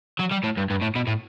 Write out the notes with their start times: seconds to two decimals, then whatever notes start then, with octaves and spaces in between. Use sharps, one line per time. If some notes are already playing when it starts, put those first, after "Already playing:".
0.19 F#3
0.31 G3
0.43 A2
0.57 G2
0.70 G2
0.81 A2
0.95 B2
1.07 A2